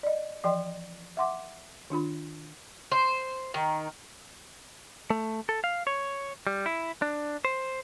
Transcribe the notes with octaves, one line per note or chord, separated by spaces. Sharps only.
D5 D#5
E3 F3 D5 D#5 G5 C6
E5 F#5 C6 D6
D#3 D4 F4 B5
C5
D#3
A3
A4
F5
C#5
G3
E4
D4
C5